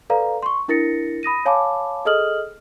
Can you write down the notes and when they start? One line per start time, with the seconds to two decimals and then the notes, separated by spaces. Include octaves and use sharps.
0.10 A4 B4 D5 F5 A#5
0.43 C6 C#6
0.68 D4 E4 A#4 A6 A#6 C#7
1.23 B5 D#6 A#6 D#7
1.46 C#5 F5 G#5 A5 B5 D6
2.05 G#4 A4 D#5 D#6 F6 F#7